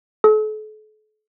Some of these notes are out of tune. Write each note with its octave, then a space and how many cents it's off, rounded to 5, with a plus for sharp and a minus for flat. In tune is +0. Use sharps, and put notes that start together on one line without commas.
A4 -40